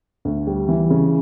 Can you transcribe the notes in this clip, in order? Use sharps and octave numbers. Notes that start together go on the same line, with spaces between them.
D2
G3
E3
C#3